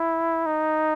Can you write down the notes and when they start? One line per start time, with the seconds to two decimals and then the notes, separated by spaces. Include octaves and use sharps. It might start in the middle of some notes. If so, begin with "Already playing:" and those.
Already playing: E4
0.46 D#4